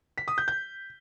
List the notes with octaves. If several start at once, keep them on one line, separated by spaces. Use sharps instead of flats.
B6
D#6
G6
G6